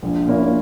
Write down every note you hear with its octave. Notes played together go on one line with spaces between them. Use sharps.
A#1
A#2 A#3 C#4 E4